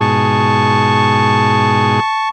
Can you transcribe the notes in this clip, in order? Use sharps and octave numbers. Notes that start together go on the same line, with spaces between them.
G#2 B2 G#4 A5 C#6